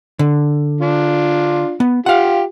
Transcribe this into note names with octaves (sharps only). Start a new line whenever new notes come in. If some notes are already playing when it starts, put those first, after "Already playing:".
D3
D4 F4
B3
F4 G4 F5 F#5